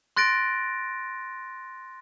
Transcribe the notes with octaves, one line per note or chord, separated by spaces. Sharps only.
C6 F#6 A6 A#6 D7